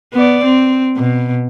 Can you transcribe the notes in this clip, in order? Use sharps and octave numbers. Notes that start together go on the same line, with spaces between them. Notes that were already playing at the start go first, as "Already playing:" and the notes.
B3 D5
C4
B2